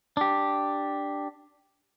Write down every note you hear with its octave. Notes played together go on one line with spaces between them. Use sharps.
D4 G4